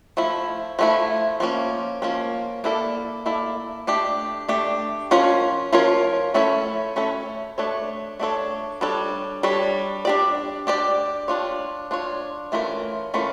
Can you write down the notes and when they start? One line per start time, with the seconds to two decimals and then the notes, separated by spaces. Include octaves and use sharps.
0.17 F3 A3 E4
0.79 F3 A3 E4
1.40 F3 A#3 C#4
2.02 F3 A#3 C#4
2.64 A#3 E4 A4 D5
3.26 A#3 E4 A4 D5
3.87 A3 D4 G4
4.48 A3 D4 G4
5.11 F3 C#4 F4 A#4 C#5
5.73 F3 C#4 F4 A#4 C#5
6.34 A3 C#4 E4 A4 C#5
6.96 A3 C#4 E4 A4 C#5
7.58 A3 D4 A4 C#5
8.19 A3 D4 A4 C#5
8.81 G3 D4 A4 C#5
9.43 G3 D4 A4 C#5
10.05 D4 G4 D5
10.67 D4 G4 D5
11.28 D4 F4 C#5
11.91 D4 F4 C#5
12.52 E3 A3 C#4 F4 A#4
13.14 E3 A3 C#4 F4 A#4